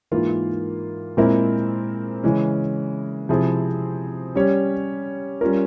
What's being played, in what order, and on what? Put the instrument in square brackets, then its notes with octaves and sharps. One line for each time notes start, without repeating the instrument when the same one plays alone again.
[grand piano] G#2 E3 A#3 F4
A#2 G#3 C4 E4 A#4
C#3 E3 G#3 C#4
C3 F3 C4 E4 G#4
G3 C#4 G4 C#5
G3 C#4 F4 A#4